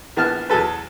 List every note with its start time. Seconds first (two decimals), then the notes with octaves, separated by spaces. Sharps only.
0.16 A#1 E3 B3 A5 F6
0.49 E2 F#3 G#4 A4 B4